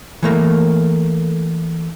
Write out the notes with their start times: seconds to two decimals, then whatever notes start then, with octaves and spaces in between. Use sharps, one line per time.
0.23 E3 A3 A#3